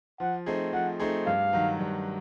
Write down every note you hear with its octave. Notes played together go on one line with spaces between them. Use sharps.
F3 F#5
A3 C4 D#4 G#4
F3 F#5
A3 C4 D#4 G#4
G2 F5
D#3 F#3
G2